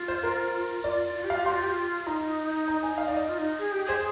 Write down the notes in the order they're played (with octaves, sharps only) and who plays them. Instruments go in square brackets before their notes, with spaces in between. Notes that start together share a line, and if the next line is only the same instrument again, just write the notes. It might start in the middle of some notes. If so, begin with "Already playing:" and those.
Already playing: [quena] F4
[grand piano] C5
A#4
[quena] F4 [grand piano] D5
[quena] F4
G4
[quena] F4 [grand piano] F5
[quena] G4 [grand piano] C6
[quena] F4
G4
F4
[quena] D#4 [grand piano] A#5
[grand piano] A#5
G#5
F5
D5
D#5
[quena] F4
D#4
G#4
G4
[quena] G#4 [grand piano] C5